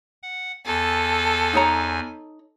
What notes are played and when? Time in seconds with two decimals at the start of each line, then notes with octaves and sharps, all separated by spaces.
0.23 F#5
0.66 E2 A4 G#5
1.53 D#4 C#5 A#5